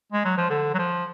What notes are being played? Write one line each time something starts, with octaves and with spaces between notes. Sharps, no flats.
G#3
F#3
F3
D3
F#3
F3